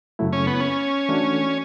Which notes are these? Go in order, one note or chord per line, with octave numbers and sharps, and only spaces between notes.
F#2 C#3 F#3 A3 E4
C#4
B3
C#4
E3 A3 D4 F#4